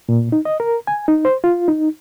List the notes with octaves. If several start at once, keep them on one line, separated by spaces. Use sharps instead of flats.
A#2
D#4
D#5
A#4
G#5
D#4
C5
F4
D#4